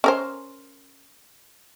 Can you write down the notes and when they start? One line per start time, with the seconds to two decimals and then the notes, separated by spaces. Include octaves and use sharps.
0.04 C#4 A#4 C5